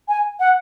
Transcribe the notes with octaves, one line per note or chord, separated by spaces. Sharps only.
G#5
F#5